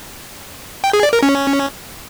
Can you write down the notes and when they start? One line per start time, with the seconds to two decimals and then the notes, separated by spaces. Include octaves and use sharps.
0.84 G5
0.93 G#4
1.03 D5
1.13 A#4
1.23 C#4